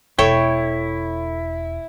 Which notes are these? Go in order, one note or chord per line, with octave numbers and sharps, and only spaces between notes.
E1 E4 A4 C#5 G5